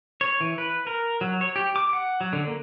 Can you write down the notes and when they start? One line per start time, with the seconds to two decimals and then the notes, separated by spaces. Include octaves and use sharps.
0.21 C#5
0.41 E3
0.58 B4
0.87 A#4
1.21 F#3
1.41 C#5
1.56 G4
1.76 D6
1.93 F#5
2.21 F#3
2.33 D3
2.47 A#3